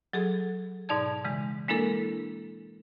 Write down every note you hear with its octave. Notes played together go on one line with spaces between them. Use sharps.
F#3 G#4 A4
G#2 B2 D#4 D5 A5 G#6
C#3 E3 G#3
G#3 A#3 D4 E4 A4 A#4